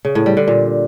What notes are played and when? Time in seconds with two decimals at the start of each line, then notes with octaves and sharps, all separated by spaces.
0.05 C#3
0.15 A2
0.26 G3
0.37 D3
0.48 A#2